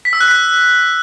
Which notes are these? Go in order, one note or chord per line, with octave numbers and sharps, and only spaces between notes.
B6
E6
F#6
B6